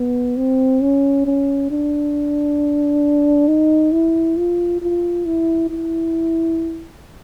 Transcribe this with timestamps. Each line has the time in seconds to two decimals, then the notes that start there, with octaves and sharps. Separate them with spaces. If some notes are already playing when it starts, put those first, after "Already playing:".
Already playing: B3
0.37 C4
0.81 C#4
1.26 C#4
1.71 D4
3.48 D#4
3.92 E4
4.37 F4
4.81 F4
5.26 E4
5.70 E4